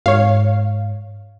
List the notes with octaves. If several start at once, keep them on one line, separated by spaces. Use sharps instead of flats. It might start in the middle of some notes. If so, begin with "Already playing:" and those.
G#2 C#5 F5